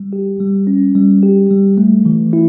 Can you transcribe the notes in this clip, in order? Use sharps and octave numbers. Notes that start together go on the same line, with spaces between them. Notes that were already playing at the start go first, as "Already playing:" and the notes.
Already playing: G3
G4
G3
C#4
G3
G4
G3
A3
E3
E4